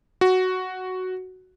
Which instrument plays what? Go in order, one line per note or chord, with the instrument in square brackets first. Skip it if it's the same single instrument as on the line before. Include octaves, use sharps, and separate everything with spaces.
[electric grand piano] F#4